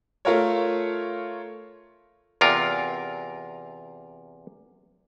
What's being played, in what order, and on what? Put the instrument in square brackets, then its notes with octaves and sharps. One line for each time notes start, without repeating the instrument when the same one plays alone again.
[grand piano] A3 F4 A#4 C#5
[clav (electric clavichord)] E2 C3 F4 A#4